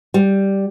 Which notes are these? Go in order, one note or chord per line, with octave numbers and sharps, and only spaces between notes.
G3